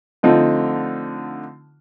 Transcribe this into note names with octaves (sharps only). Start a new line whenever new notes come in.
D3 F3 A3 C4 D#4 F4